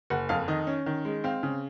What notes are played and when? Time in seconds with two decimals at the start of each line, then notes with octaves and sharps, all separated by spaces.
0.10 F#1 F#5
0.29 F2 F5
0.48 D#3 D#5
0.67 C#4
0.86 D#3
1.05 G#3
1.24 C4 F5
1.43 C#3